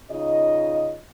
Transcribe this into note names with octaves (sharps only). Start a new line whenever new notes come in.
C#3 D#4 F4 D#5